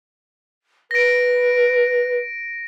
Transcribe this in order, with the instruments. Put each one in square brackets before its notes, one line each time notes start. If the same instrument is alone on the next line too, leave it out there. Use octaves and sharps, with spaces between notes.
[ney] B4 [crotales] A#6 D7